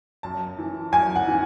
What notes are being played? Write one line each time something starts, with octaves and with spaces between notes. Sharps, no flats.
F#2 A5
E3
F#2 G#5
F#5
E3